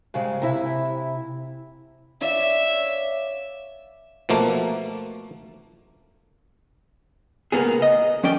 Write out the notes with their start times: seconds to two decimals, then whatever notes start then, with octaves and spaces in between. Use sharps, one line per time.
0.14 G#2 C#3 G3 G#3
0.42 C3 E4 E5
2.21 C#5 D5 E5 F5
4.29 B2 F3 A3 A#3
7.52 C#2 A#2 A#3 B3 G#4
7.82 D#5
8.24 F3 C#4 D5 G5